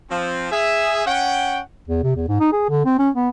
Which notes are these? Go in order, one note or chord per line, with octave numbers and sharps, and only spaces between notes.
F3 C4
G#4 E5
C#4 F#5 G5
E2
C3
E2
G#2
D#4
G#4
D3
C4
C#4
B3